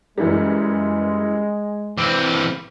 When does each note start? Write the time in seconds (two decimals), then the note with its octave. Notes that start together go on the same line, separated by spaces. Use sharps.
0.18 F#2 E3 G3 G#3
1.98 E3 C4 D6